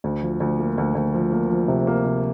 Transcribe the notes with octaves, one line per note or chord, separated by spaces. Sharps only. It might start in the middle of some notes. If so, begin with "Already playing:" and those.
D2
F3
D2
A#3
D2
D2
F3
A#3
F3
C3
A#3
C3